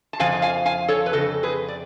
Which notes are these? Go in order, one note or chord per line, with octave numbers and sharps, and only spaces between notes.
A5
F2 C#3 F3 F5 G#5
F5 G#5
F5 G#5
A4 C#5
B4
F2 C#3 A4
G#4 B4
D5